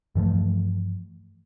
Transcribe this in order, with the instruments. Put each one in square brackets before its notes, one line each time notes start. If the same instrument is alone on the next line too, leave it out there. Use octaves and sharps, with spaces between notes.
[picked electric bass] G2 E3 F3 A3